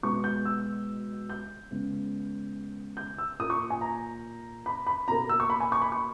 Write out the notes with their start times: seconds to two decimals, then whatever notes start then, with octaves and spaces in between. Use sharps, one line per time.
0.03 B2 G#3 B3 C#6
0.24 G6
0.45 E6
1.29 G6
1.71 C#3 G#3 B3
2.97 G6
3.18 E6
3.39 A#2 A#3 D#6
3.50 C#6
3.70 G#5
3.81 A#5
4.66 B5
4.87 B5
5.08 B2 A#3 A#5
5.29 E6
5.40 C#6
5.50 B5
5.60 G#5
5.72 C#6
5.82 B5
5.92 C#6